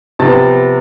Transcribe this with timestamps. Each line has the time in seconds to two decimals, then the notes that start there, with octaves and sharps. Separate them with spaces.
0.19 C3 F3 B3 A5 A6